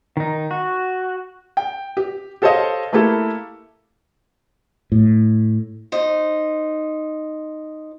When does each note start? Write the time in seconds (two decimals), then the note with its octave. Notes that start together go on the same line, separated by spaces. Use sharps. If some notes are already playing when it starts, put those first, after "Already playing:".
0.17 D#3 D#4
0.51 F#4
1.57 G5
1.97 G4
2.42 G4 A4 C5 C#5 D#5 F5
2.92 A3 A#3 E4 G4 A4
4.92 A2
5.92 D#4 C5